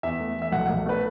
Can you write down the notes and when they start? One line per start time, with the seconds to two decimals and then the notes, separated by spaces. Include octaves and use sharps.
0.03 E2 E5
0.20 A3
0.36 E3
0.42 E5
0.52 B1 F#5
0.66 B1 F#5
0.86 A3 B4